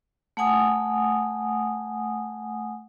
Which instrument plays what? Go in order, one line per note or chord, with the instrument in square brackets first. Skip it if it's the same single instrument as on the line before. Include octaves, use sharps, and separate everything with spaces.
[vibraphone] A3 F#5 G#5 D#6